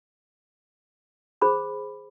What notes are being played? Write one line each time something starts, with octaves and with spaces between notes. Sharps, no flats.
G#4 C5 B5 D6